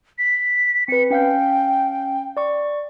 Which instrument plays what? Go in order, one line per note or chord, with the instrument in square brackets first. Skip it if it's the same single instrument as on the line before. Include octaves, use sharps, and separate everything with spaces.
[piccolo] B6
[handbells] C4 B4 [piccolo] C#7
[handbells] C#4 F5 G6 [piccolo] G5
[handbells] D5 C#6